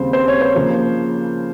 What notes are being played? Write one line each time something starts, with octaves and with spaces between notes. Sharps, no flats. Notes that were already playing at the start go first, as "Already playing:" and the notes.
Already playing: D#2 C#3 G3 C4 C5
C5
C#5
C5
C#3 F3 A#3